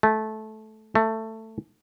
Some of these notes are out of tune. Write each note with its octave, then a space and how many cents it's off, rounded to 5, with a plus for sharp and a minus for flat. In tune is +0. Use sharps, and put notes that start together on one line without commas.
A3 -15
A3 +15